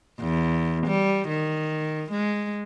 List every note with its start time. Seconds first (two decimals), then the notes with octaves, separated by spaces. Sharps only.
0.20 E2
0.87 G3
1.28 D#3
2.12 G#3